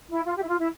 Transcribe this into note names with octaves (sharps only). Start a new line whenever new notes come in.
E4
F4
G4
E4
F4
E4